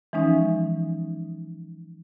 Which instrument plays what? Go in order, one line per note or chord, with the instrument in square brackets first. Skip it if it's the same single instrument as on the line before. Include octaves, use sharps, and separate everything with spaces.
[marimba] E3 F3 G#3 C#4 D#4